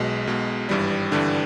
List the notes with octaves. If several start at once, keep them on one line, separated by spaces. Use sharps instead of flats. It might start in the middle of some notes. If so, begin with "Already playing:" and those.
Already playing: B1 B2 G#3
B1 B2 G#3
G#1 G2 E3 G3
G#1 G2 D3 E3 G3 D4